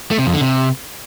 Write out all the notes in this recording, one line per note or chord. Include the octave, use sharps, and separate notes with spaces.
A3
C3
F2
D3
C3